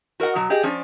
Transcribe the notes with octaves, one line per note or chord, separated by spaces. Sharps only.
F#4 A#4 D#5 F#5
B2 F#3
G4 G#4 D#5
F3 C#4 D4